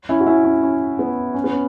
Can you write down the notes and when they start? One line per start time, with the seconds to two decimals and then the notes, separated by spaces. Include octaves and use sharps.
0.09 C#4 E4
0.20 F#4
0.26 C#4 E4
0.45 C#4
0.63 C#4
0.99 B3
1.34 C#4
1.44 B3
1.53 C#4